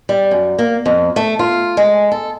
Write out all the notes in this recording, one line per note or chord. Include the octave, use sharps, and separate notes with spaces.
G3
F#2
A#3
F2
A3
F4
G#3
A4